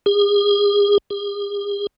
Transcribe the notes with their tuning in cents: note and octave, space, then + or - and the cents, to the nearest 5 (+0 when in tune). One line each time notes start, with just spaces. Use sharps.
G#4 -35
G#4 -45